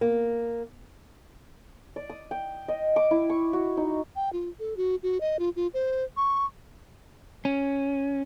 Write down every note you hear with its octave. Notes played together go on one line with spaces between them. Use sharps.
A#3
D5
D#6
G5
D#5
D6
E4
C#6
F#4
D#4
G5
F4
A4
F#4
F#4
D#5
F4
F4
C5
C#6
C#4